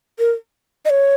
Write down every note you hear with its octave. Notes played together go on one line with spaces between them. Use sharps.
A#4
D#5
C#5